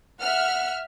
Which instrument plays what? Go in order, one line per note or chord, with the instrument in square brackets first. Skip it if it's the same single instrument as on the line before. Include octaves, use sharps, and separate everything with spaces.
[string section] E5 F6 [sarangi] F#5